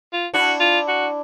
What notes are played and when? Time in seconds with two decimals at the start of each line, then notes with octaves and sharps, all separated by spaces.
0.13 F4
0.34 D4 E4 F#4
0.60 F4
0.88 F#4